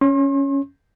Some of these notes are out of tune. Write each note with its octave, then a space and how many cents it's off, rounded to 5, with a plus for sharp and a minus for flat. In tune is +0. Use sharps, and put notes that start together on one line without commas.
C#4 +0 C6 +45